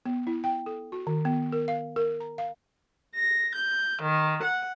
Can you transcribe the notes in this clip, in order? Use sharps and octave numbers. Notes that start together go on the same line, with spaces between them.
B3
E4
G5
A4
F#4
D#3
B3
A#4
F5
A#4
A#5
F5
A#6
G6
D#3
F#5